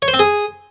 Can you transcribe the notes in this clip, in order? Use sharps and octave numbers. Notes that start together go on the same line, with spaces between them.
C#5
C5
C4
G#4